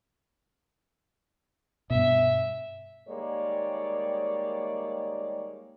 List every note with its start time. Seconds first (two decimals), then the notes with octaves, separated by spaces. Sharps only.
1.90 G2 B2 E5
3.09 D#3 G3 G#3 A#3 C#5 D5